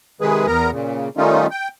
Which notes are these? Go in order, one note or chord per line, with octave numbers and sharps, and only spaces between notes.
C3 D#3 G#3 G#4 B4
E2 B3 A#4 A#5
A#2 C#3
D#3 G3 A3 C#4 D#4 F4
G5